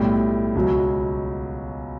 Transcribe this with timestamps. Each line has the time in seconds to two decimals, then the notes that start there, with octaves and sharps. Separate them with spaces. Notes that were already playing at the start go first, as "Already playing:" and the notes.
Already playing: B1 A2 G3
0.55 C#2 B2 F#3